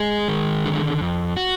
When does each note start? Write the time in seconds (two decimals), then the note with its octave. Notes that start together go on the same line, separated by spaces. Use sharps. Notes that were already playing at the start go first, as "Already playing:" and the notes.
Already playing: G#3 G#4
0.28 D#3
0.65 D3
1.01 F2
1.37 F#4